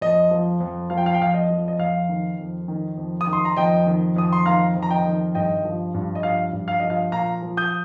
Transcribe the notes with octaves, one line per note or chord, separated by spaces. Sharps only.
F2 D#5
F3
F2
F3 F5
G5
F5
G5
F2 F5
D#5
F3
D#5
F2 F5
D#3
F2
D#3
F2
D#6
D#3
C6
A#5
F2 D#5 G5
D#3
F2 D#6
C6
D#3 F5 A#5
F2
A#5
D#5 G5
D#3
G2 D#5 G5
F3
G2
D#5
F3 F5
G2
F5
F3 D#5
F5
A#2 F5 A#5
F3
D#6 G6